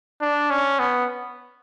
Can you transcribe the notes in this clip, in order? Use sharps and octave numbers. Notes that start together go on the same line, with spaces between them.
D4
C#4
B3